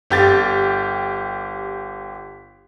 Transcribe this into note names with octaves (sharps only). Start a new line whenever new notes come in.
G1 G4 A6